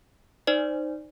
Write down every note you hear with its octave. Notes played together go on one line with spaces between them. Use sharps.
D#4 C5 D5